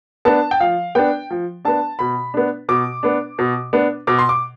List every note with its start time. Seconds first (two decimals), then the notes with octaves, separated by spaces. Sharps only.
0.25 B3 D4 A5
0.51 G5
0.60 F3 F5
0.95 B3 D4 G5
1.31 F3
1.65 B3 D4 A5
1.99 B2 B5
2.34 B3 D4
2.69 B2 D6
3.03 B3 D4
3.39 B2
3.73 B3 D4
4.07 B2 D6
4.19 C6
4.29 D6